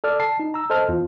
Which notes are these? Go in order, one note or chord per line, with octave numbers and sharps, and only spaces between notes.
A4 D5 F6
A5 C7
D#4
A#5 E6
A4 C5 D#5 A5 F6
E2 F4